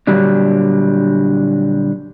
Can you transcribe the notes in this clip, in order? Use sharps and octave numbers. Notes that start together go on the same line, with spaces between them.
A#2 D3 F#3 G3 D4